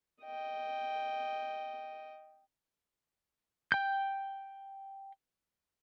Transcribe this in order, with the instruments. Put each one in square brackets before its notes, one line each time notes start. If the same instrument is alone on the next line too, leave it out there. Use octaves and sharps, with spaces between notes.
[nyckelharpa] D#5 G5
[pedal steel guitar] G5 G6